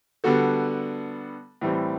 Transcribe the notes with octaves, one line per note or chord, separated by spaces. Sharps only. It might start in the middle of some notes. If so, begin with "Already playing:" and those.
D3 G3 B3 F#4 A4
A2 E3 G3 C4